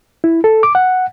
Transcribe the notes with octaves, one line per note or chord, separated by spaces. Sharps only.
E4
A4
D6
F#5